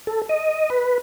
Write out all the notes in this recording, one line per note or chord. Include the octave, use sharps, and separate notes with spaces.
A4
D#5
B4